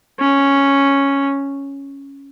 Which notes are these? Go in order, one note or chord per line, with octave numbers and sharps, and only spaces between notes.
C#4